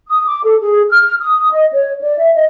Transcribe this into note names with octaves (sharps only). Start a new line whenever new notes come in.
D#6
D6
A4
G#4
F6
D#6
D#5
C#5
D5
E5
D#5